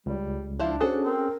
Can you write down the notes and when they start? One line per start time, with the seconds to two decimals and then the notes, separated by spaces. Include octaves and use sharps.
0.06 C#2 G3
0.59 F3 D4 E4 F4
0.81 C#4 F#4 G#4 A4 C5
1.04 C4 A#4